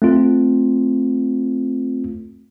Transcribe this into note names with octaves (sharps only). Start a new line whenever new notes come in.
A3 C4 F4